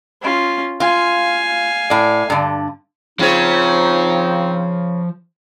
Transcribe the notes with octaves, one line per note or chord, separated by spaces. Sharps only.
C#4 F4
F4 F5 G#5
A2 D5
G2 D3
C#3 F3 C4 D#4 F4 C#5